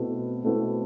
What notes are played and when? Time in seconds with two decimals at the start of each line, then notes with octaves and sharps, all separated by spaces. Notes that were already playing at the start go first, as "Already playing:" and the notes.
Already playing: B2 A3 C4 E4 B4
0.43 B2 A3 C4 E4 B4